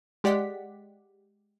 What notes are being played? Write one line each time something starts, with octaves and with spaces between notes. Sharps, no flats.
G#3 G4 D5 F#5 B6